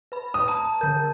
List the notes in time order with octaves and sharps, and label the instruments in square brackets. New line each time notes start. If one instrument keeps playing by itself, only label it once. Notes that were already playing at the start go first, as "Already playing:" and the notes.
[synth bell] B4 B5
[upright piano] D#6
[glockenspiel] A5 [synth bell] A#5
[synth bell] D3 A#4 [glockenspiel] G6